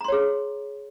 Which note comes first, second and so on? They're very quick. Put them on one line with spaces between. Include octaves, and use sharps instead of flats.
A#5 C6 C#5 G#4